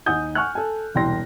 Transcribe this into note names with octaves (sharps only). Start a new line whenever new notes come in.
D#2 D#4 F#5 G#5 D#6 G6
F#5 G#5 C#6 F6 F#6
A4 G#5
E1 C2 G5 C6 A#6